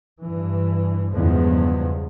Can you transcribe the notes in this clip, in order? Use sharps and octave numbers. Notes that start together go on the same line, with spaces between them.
G2 E3
E2 G2 C#3 F3 G#3